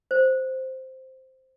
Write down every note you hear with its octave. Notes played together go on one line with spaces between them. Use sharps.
C5